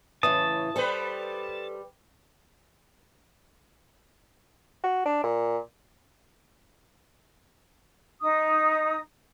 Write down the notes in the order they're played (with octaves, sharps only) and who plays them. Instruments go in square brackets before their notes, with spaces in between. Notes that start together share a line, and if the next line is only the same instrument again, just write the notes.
[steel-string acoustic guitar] A2 C#3 E3 [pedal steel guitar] A5 [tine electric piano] D#6
[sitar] G3 B4 [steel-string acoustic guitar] A4 C5
[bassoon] F#4
D4
A#2
[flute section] D#4 D#6